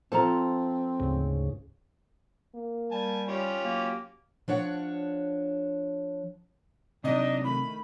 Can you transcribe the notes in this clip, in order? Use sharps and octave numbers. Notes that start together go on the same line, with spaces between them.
F3 C4 A4 C5 A5 A#5
D2 G#2 C#3
A#3
G3 G#5 A5
C#4 F4 G4
F#3 A#3
F3 D4 C#5 F#5
C3 F#3 D4 D#4 D#5
D#3 A3 B5